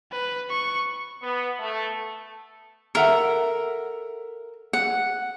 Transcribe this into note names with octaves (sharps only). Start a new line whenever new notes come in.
B4
C#6
B3
A3
A4 A#4 E5 F#5
F#5